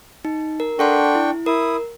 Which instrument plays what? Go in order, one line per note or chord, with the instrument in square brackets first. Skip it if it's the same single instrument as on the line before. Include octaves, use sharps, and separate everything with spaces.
[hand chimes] D#4
A#4
[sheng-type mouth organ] D4 G5 C#6 [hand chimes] A4 F#5 C6
[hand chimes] E4
[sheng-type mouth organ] E4 D#6 [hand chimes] A#4